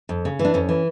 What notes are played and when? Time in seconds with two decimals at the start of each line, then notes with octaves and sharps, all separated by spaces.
0.09 F2
0.25 C#3
0.39 E3
0.45 D4
0.54 F2 C#4
0.69 E3